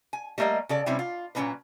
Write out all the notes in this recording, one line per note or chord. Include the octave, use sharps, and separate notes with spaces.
G#5
G3 A3 A#3 D#5 G5
C#3 A4 D5
C3 G3 C4 C#4 E4
F4
A#2 F#3 A#3 C#4 D#4 B4